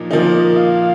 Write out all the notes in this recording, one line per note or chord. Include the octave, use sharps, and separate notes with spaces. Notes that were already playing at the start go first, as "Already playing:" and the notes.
Already playing: A#2 F3 D#4
A#2 F3 A#3 D#4
D#5
F5